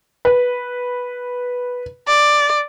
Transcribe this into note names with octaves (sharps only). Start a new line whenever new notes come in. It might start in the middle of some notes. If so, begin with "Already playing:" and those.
B4
D5